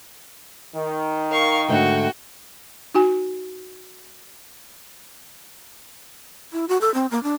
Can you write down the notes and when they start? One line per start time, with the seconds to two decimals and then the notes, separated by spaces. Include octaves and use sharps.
0.74 D#3
1.30 A#4 F5 C#6
1.69 G#2 D3 A3 F#4 G5
2.95 D#4 F#4 G#5
6.52 E4
6.69 F#4
6.81 A4
6.94 C4
7.11 A#3
7.23 D4